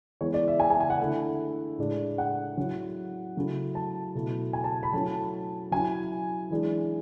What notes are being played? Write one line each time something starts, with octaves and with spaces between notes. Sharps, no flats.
E3 G#3 B3 C#5
D5
E5
G#5
G#5
G#5
F#5
D3 A3 E4
A2 G#3 D4
F#5
F#3 C#4 E4
C#3 F#3 A3 C#4 E4
A5
B2 A3 E4
G#5
A5
B5
F#3 A3 C#4 E4 A5
F#3 C#4 E4 G#5
E3 G#3 D4